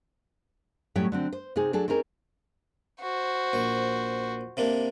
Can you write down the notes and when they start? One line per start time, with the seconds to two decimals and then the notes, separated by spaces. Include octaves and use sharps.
0.95 A2 F#3 G3 C#4 G5
1.12 D3 F#3 C4
1.33 C5
1.56 C3 C4 D#4 G#4
1.73 F#3 D4 G#4 A4
1.88 C4 C#4 D#4 G#4 A#4
3.01 F#4 C5
3.53 A#1 C#6
4.57 C3 A#3 D4